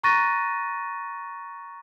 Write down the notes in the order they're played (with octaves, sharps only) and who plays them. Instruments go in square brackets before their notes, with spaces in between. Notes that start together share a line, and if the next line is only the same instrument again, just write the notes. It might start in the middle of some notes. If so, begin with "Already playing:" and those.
[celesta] A#5 C#6 F#6 A6 A#6 D#7